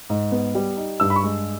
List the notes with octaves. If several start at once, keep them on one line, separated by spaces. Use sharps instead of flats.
G#2
B3
G3
D#4
G2 E6
B5
C#6
G#3